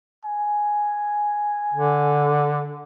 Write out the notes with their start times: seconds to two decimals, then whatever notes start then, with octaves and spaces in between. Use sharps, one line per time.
0.25 G#5
1.74 D3